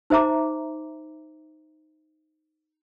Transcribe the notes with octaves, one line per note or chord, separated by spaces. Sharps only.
D#4 C5 E5 A#5 D6